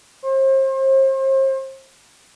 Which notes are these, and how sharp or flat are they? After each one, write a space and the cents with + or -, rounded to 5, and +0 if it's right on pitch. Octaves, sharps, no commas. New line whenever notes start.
C5 +35